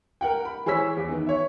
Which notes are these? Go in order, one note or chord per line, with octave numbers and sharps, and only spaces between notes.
A#4 F#5 G5
B5
E3 G#4 C5 C#5 E6 B6
E2
D#3 B3
C#5 E5